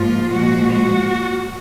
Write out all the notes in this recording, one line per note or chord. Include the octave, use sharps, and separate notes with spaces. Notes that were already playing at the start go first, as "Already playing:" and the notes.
Already playing: G#2 F3 A#3 F4
A#2 F3 G#3 F#4
F#4